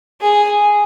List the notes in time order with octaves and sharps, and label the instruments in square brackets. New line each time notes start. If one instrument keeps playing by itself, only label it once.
[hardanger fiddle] G#4